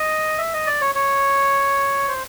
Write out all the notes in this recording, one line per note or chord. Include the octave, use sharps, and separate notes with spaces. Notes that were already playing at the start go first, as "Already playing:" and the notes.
Already playing: D#5
E5
D#5
D5
C#5
C#5
C5